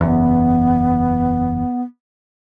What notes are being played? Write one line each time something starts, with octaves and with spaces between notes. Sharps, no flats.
F#1 E2 B3